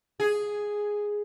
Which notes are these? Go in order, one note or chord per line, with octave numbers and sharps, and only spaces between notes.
G#4